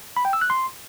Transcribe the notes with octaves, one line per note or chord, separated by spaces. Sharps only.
B5
G5
E6
F#6
C6